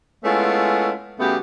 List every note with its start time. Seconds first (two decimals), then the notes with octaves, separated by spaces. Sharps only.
0.24 G#3 A3 B3 C#4 E4 F4
1.19 C#3 G3 A3 B3 F#4 G4